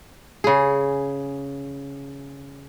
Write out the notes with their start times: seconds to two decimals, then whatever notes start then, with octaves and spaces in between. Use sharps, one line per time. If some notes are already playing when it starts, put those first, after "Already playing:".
0.44 C#3 G#4